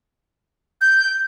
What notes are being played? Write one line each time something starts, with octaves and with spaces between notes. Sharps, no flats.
G6